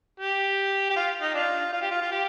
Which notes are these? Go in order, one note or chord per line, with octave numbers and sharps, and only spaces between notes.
G4
G4
F4
D#4
D4 F4
F4
G4
F4
F4
G4